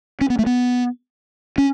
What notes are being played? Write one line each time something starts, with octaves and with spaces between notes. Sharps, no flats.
C#4
B3
A3
B3
C#4